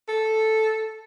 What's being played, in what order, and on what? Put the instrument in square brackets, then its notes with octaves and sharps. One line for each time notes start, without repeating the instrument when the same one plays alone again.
[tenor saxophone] A4